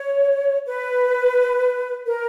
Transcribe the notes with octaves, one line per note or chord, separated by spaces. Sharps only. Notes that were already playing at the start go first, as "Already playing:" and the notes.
Already playing: C#5
B4
A#4